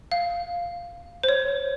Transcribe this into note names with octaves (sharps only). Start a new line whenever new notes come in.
F5
C5
C#5